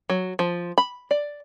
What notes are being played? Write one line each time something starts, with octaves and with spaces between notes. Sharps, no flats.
F#3
F3
B5
D5